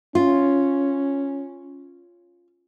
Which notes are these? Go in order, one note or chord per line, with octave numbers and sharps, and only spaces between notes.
C#4 F4